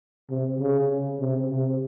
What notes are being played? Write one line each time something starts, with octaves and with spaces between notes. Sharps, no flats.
C3
C#3
C3
C3